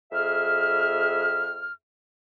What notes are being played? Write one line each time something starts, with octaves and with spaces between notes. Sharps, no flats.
F2 G#4 E5 F6